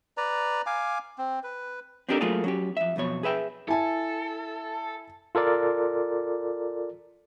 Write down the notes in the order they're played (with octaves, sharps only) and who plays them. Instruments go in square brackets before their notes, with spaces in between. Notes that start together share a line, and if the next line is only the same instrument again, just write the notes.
[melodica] B4 D5 A#5
F5 G#5 D6
C4
B4
[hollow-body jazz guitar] C4 D4 D#4 G4 A4 A#4
F#3 A3 A#3 F4 G#4 A4
F#3 C#4 G4
F2 E5
B1 F2 B2 C#5
G#4 B4 E5 G5
[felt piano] E4 G#5 A5 [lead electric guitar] A4
[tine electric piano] F4 A4 A#4 D5